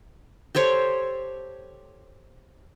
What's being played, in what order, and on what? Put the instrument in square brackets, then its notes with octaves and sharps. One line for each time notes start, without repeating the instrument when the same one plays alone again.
[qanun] G4 A4 C5 C#5